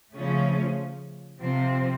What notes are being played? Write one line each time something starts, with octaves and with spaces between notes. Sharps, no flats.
C#3 F3 A3 C#4
C3 F3 C4